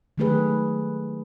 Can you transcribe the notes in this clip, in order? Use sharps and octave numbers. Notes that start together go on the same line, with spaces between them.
D#3 F#3 A3 G4 G#4 B4